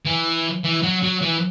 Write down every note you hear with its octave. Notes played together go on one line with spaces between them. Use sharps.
E3
E3
F#3
F#3
E3